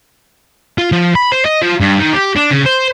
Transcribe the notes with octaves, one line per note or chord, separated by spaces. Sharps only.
F4
F3
B5
C5
D#5
F3
G2
D#3
G4
D4
C#3
C5